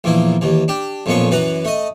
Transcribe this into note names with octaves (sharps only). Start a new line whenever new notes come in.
A#1 E2 A#3 E4
D#2 E3
D4 G4
B1 F2 A#2 B3 C#4 C#6
F#2 E3 B4 F#5 A#5
A3 D#5